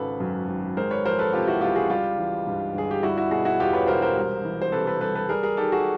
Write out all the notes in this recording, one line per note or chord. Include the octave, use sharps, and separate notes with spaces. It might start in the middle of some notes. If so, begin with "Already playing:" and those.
Already playing: G#1 C#3 A4 B4
F#2
G#1
G#3 A#4 C5
B4 C#5
F3 A#4 C5
A4 B4
C3 F4 G4
E4 F#4
C#2 F4 G4
F#4 G#4
G3 F4 G4
E3
G2
G1 G#4
G4
G3 E4 F#4
E4 F#4
B2 F#4 G#4
E4 F#4
E2 F4 G4
B4 C#5
E1 A#4 C5
A#4 C5
C2
E3
C5
C3 A4 B4
A4 B4
C2 A4 B4
A4 B4
G3 G#4 A#4
G#4 A#4
D#3 G4 A4
F#4 G#4